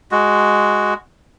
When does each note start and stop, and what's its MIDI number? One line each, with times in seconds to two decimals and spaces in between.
0.12 0.94 56
0.12 0.94 66